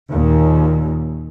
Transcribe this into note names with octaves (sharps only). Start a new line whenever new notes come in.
D#2 A#2